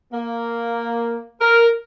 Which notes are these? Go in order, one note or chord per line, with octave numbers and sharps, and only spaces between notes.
A#3
A#4